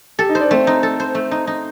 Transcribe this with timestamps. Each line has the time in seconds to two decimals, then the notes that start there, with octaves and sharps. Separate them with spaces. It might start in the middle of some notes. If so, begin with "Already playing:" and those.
0.19 G4 A4
0.29 D#4
0.35 C5
0.41 D4
0.51 A3 C4
0.67 D#4
0.83 A4
1.00 C5
1.15 A3
1.31 D#4
1.47 D#4